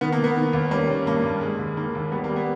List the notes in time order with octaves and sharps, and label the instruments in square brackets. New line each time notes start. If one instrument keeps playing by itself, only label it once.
[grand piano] D#3 B3
A#3
D#3
B3
D#3
D#2
G3 A#3 C#4
D#3
G2 A#3
G2
G#3
D#2
D#3 A#3
D#2
G3 B3
A#3
G3
B3